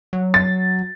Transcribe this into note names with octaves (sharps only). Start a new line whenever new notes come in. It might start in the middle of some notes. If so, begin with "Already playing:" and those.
F#3
A6